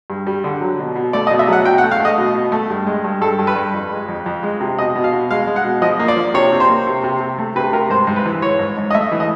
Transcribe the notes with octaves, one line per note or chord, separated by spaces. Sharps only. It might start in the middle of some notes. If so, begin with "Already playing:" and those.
G2
G3
D3
F#3
B2
B2
A3 D5
B2 D#5
E5
F#3 F#5
B2 G5
A3 F#5
F5
A3 D#5
B2
B2
A3
G2
G#3
G2
G2 A4
G2
B4
G2
F2
G#3
F2
F2
G#3
C3
B2 D#5
B2
F5
B2
G#3 F5
G#3
F#5
B2
F3 D#5
A#3
D5
F3
C3 C#5
C3
C5
A#3
C3
C3
C3
A3
C3 B4
C3 A#4
G#2 C5
G#2
B4
E3
E3 C#5
G#2
G#2
D#5
A3 E5
E3
D#5